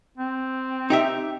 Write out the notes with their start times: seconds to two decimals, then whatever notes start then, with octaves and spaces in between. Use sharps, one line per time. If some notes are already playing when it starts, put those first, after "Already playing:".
0.17 C4
0.90 D#4 G4 E5